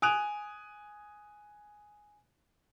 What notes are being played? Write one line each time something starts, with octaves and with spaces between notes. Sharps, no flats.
G#5 D#6 F#6 D7 F7